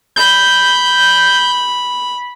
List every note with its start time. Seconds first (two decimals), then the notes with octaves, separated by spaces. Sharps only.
0.16 B5 G6